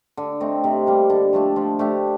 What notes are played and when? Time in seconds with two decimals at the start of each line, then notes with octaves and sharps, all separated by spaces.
0.17 D3
0.40 A3 C4 D#4
0.64 C3
0.87 G3 A#3
1.10 D3
1.33 F3 A3 D4
1.56 F3
1.79 A3 D4 G4